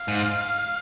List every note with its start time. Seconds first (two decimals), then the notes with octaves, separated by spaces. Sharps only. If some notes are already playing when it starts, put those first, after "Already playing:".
Already playing: F5
0.08 G#2